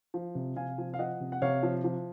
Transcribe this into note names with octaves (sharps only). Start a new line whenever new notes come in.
F3
C3
C3 F5 G#5
F3
F5
F3 D#5 F#5
C3
F#5
C3 C#5 F5
F3
F3